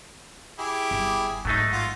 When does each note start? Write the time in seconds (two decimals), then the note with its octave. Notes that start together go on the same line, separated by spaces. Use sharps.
0.59 E4 G4 G#4
0.91 G1
1.45 A1 G#2 F#3 A3 D#4
1.72 F4 F#5